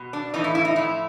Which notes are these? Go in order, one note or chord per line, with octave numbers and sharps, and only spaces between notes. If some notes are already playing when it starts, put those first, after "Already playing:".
Already playing: B2
D4
A2 E3 D#4
E4
E4
D#4
A2 F3 E4